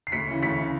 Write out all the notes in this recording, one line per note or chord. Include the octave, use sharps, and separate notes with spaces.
C7
D2 B6 C#7
C#3 E3
D2 B6 C#7
C#3 E3